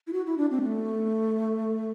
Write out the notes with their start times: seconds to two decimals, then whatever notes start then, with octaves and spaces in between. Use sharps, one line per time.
0.07 E4
0.13 F#4
0.26 E4
0.38 D4
0.51 C4
0.62 A3